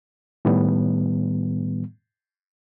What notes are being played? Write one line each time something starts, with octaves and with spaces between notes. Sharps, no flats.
A2 D#3 G3 B3